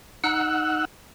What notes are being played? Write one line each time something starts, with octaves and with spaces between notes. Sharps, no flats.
D#4 F#5 E6 F#6